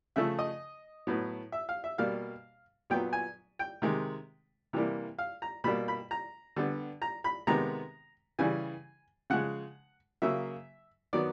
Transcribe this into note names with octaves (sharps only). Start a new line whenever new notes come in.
C#3 F3 A3 E5
D#5
A2 F#3 B3
E5
F5
E5
B2 G3 A#3 F5
A#2 F#3 B3 G5
G#5
G5
C3 D#3 G#3
C3 E3 G3 A#3
F5
A#5
B2 G3 A#3 B5
B5
A#5
D3 G3 B3
A#5
B5
C3 D#3 G#3 B3 A#5
C#3 E3 G3 G#5
C#3 F3 G#3 F#5
C#3 F#3 A#3 E5
D#3 F#3 B3 D5